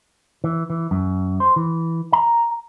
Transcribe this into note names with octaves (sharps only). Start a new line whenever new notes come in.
E3
E3
F#2
C5
E3
A#5